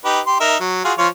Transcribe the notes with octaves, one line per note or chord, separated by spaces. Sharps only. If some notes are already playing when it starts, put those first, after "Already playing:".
D#4 G4 B4
G4 C6
D#4 A#4 E5
F#3
F4 F#4 G#4
F3 F4 C#5